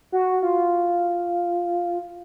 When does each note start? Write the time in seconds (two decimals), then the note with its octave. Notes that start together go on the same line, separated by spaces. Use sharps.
0.12 F#4
0.42 F4